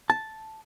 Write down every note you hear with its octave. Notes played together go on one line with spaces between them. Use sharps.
A5